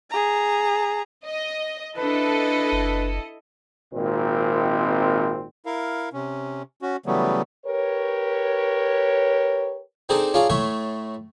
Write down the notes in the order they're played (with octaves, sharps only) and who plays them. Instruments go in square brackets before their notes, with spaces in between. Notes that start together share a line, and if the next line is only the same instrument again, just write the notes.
[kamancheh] G#4 A#5
[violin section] D#5
[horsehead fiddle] D4 B4 [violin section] E4 A4 D#5
[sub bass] F#1
[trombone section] G#1 A#2 D#3 C4
[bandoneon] E4 A#4 F5
C3 C#4
C#4 F#4
C#3 E3 F#3 G3 A3 B3
[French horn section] G4 A#4 B4 C#5
[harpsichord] C4 D4 D#4 G#4 A4 C5
C#4 D4 F4 G#4 F5 A#5
A2 A3 C#5 E5 C6